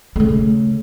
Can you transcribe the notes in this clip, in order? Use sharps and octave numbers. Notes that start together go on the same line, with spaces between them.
C#3 A3